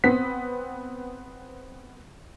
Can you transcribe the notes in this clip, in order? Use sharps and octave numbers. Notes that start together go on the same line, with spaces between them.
B3 C4 B6